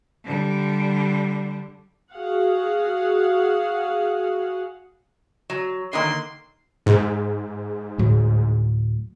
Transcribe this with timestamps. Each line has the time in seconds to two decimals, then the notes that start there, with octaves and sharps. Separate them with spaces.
0.24 D3 G3
2.12 F#4 G#4 F5 F#5
5.50 F#3
5.93 D3 D#3 A#3 C6
6.86 G#2
7.98 D2 A2 F#3